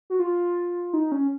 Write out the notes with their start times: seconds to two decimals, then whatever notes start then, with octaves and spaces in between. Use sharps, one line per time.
0.10 F#4
0.19 F4
0.94 D#4
1.12 C#4